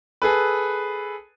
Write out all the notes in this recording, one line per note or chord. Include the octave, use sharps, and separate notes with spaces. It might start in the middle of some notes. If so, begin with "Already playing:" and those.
G#4 A4 B4